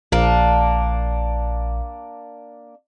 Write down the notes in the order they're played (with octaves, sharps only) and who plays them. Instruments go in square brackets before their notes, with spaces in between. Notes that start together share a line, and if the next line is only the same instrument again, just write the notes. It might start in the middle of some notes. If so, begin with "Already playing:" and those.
[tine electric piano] A#1 [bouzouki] A#3 D4